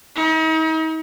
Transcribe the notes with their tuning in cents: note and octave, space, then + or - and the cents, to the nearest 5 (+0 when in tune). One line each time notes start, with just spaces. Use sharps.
D#4 +40